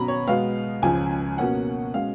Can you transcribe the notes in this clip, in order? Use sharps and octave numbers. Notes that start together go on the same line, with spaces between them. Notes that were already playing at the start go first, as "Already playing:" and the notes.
Already playing: B2 F#3 C#4 A#5 B5
C#5
B2 G#3 B3 F5
C#2 C#3 F3 G#5
B2 A#3 C#4 F#5
B2 G#3 C#4 F5